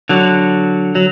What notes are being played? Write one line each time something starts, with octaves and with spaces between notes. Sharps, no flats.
D3 F#3
F#3